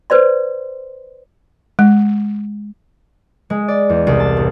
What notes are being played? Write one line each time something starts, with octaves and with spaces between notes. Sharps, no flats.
B4 C5 D5 C6
G#3
G#3
D5
E2
C2
A5
A1